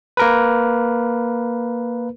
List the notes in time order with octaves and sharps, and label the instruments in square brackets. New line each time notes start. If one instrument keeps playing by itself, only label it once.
[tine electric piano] A#3 A#4 B4